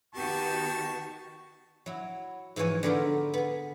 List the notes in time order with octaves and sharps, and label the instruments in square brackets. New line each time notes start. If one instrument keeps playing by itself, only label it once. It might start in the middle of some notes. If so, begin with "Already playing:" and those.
[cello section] D#3 B3 F#4 [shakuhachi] G4 [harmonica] A5 C#6
[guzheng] F#3 E4
G#2 E3 F3 C#5 G#5
D3 B3 A#4 C5
B3 G#4